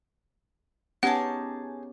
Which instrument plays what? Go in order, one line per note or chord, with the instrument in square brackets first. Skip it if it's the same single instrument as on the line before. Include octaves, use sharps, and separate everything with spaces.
[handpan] B3 C#4 G4 [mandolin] D#4 G#4 A5 [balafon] F#5